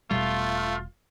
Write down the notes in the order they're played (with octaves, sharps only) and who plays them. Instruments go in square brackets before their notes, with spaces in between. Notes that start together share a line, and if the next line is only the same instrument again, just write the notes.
[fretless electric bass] E1 B2 G3 [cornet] A3 [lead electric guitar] F4